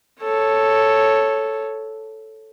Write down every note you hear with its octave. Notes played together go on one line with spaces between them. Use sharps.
A4 C#5